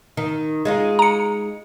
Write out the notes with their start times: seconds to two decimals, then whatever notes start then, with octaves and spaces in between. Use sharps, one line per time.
0.17 D#3
0.65 G#3 D#4 F4
0.99 A#5 C#7